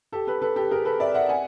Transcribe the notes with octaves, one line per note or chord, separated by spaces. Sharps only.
G4 A4
A4 B4
A4 B4
G4 A4
G#4 A#4
A4 B4
D5 E5
E5 F#5
F#5 G#5